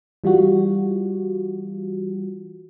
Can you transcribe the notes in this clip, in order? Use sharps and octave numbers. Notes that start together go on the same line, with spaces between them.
E3 G3 F4 F#4